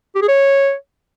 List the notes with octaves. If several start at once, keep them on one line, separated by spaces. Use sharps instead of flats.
G4
G#4
C#5